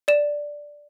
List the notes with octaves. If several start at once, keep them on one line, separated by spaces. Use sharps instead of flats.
D5 E7